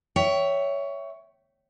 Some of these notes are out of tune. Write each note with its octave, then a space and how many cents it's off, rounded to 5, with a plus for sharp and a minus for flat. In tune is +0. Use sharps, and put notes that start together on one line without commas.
C#5 +15 E5 +0 G5 -20